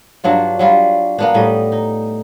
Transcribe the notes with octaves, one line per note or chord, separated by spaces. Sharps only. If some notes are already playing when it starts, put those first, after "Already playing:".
G2 F#3 D4 F4
F#3 G3 F4
A#3 B3 D4
A2 G3 D#5
D#4